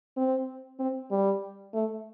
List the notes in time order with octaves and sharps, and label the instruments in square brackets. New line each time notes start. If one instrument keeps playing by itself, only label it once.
[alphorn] C4
C4
G3
A3